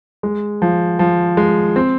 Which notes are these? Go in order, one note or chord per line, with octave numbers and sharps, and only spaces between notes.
G#3
F3
F3
G#3
C4